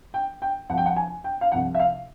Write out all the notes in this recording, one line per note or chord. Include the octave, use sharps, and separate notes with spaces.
G5
G5
C2 C3 F3 F#5
G5
F#5
G#5
G5
F5
C2 C3 F3 F#5
E5
F5